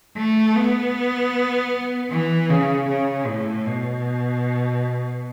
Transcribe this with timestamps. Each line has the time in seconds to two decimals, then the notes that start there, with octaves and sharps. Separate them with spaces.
0.17 A3
0.56 B3
2.10 E3
2.50 C#3
2.88 C#3
3.27 A2
3.66 B2